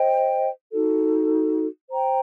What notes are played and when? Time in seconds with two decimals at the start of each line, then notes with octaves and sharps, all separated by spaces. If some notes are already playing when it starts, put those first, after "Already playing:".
Already playing: C5 D#5 G5
0.72 D#4 F#4 A4
1.90 C5 G5 A#5